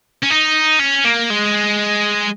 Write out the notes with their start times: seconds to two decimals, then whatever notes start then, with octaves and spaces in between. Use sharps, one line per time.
0.23 C#4
0.30 D#4
0.80 C#4
1.05 A#3
1.30 G#3